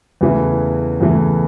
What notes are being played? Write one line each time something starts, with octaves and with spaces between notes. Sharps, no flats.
E2 C#3 E3 A3
E2 C#3 E3 A3